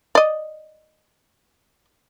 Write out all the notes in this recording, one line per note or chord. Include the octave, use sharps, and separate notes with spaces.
D5 D#5